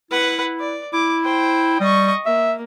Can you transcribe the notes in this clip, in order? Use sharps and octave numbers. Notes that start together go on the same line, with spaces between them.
E4 B4 F#5
D5
E4 D6
C5 G5
G3 D#5 C#6
A#3 E5